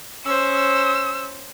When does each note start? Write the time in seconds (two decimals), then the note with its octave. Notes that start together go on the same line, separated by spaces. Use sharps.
0.24 C#4 C5 E6
0.54 E6